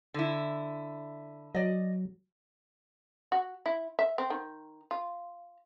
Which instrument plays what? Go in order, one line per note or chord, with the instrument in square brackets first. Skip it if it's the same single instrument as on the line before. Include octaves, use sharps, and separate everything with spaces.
[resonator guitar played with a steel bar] D3 E4
[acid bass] F#3 [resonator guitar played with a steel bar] D5 D#5
[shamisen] F#4
E4
E5
C4
D#3
F4